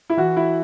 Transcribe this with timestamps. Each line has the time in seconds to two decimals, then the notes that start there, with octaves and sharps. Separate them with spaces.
0.10 E4
0.17 E3 F#4
0.37 E4